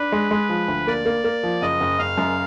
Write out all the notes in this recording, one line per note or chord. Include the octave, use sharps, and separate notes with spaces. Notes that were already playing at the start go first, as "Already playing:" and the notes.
Already playing: D4 B4
G#3
G#3
F3
D2
A#3 D5
A#3
A#3
F3
F#1 D#5
F#1
F#1 F5
F#2